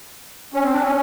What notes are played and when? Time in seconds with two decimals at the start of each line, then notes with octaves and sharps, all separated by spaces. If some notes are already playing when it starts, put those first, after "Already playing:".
0.54 C#4
0.63 C4
0.73 D4
0.82 C#4